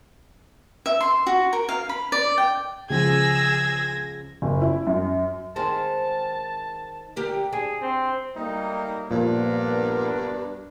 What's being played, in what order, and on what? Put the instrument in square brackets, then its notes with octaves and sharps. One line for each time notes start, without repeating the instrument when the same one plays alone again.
[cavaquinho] E5
C6
F#4
A#4
F5
B5
D5
G5
[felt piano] C#2 F3 G#3 [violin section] G#4 E6 [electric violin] G#6 A#6
[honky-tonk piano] F#1
E4
F#2
[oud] D#3 G#3 C4 [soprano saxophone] A5
[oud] D3 G4 A#4
[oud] D4 [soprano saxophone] G#4
[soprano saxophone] C4
[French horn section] F#3 A3 A#3 [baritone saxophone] G3 [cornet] D#4
[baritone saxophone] G2 [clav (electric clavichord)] A#2 F3 [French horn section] B3 A#4 [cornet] D4